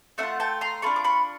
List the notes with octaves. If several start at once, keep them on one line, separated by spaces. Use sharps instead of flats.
A3 D4 E5 F#5
F4
G5 A5
A#5 C6
D4 F4 A4 B5 C#6
D6
B5 C#6